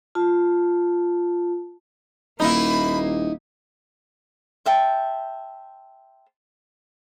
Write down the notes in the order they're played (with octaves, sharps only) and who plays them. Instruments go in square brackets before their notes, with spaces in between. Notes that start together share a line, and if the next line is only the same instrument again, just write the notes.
[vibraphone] F4 A5
[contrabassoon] D#1 [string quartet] A#3 [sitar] D#4 E4 [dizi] B5
[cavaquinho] C5 E5 G5 A5